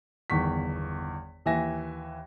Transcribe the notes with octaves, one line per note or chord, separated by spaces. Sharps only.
G1 E2 D#3 C#6 B6
D#2 E3 E5 G#5 A#6